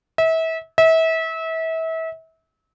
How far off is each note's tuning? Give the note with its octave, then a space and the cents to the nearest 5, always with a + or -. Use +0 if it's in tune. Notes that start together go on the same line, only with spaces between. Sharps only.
E5 -30
E5 -30